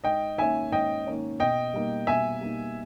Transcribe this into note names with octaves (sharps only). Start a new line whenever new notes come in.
G#2 D#5 G5
D#3 A#3 C#4 E5 G#5
G#2 D#5 G5
D#3 A#3 C#4
B2 D#5 G5
G3 A#3 D#4
B2 E5 G#5
G3 A#3 D#4